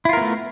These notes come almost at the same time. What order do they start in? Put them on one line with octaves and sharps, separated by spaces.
E4 F4 A#4 B3 A3